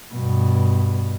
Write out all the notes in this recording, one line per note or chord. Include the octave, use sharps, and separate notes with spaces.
G2 B2